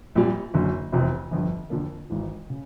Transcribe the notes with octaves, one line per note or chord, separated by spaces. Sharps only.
A#1 A#2 G3
F#1 F#2 D3
F1 E2 C3
G1 F2 D3 F3
F2 D3 F3 A#3
G#1 G#2 E3
C#3